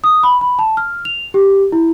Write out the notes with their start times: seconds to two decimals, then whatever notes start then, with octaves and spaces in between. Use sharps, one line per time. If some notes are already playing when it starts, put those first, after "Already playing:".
0.04 D#6
0.23 B5
0.41 B5
0.59 A5
0.77 F6
1.05 F7
1.34 G4
1.72 E4